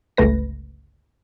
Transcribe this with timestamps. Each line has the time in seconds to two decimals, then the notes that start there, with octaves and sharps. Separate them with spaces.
0.17 G1 C#2 A3 B4 A#6